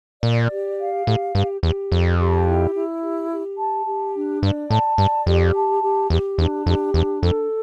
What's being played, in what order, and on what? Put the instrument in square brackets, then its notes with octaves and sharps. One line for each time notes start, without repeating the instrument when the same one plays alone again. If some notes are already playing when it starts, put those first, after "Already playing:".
[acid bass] A#2 [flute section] D5
[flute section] G4
F5
[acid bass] A2 [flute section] G4
[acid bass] G2 [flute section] G4
[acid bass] E2 [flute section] G4
[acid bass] F2 [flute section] D5
[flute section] G4
E4
E4
G4
G4
A5
G4
D4
[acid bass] G2 [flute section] D5
[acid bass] A2 [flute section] A5
[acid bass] G2 [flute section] D5
[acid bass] F2 [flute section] G4
[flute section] A5
G4
[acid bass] E2 [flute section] G4
[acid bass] E2 [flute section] D4
[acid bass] F2 [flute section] G4
[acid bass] E2 [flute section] D4
[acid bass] F2 [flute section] A4